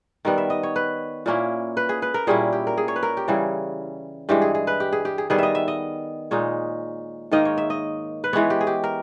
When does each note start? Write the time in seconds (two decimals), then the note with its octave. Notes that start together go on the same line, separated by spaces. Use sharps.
0.25 D#3 G3 B3 A#4
0.38 E5
0.50 D#5
0.63 C#5
0.76 B4
1.26 A#2 A#3 C#4 E4
1.77 B4
1.89 G#4
2.02 B4
2.14 A#4
2.27 A#2 G3 C#4 E4 G#4
2.53 G4
2.67 A#4
2.77 G#4
2.88 C#5
2.96 B4
3.03 A#4
3.17 G4
3.28 C#3 E3 G3 G#4
4.29 G2 E3 G#3 G4
4.42 G#4
4.55 G#4
4.67 B4
4.80 G4
4.92 G#4
5.05 G4
5.18 G#4
5.30 D#3 G3 B3 G#4
5.38 D#5 E5
5.55 E5
5.68 D#5
6.31 A#2 G#3 D#4 C#5
7.31 G#2 D#3 A#3 D#4 D#5
7.45 C#5
7.58 E5
7.70 D#5
8.24 B4
8.33 E3 G#3 B3 C#5
8.50 G4
8.61 G#4
8.67 G4
8.84 A#4